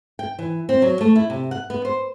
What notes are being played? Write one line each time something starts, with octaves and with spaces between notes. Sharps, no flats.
G5
E3
C4
F#3
A3
E4
C3
F#5
B3
C5